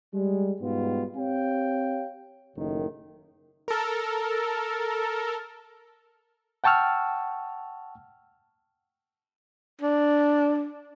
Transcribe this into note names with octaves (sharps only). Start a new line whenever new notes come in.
G3 G#3
G#2 B2 G3 B3 F4
C4 G4 C#5 F5 G5
F#1 A2 D#3
A4 A#4
F#5 G5 A5 C#6 E6 F6
D4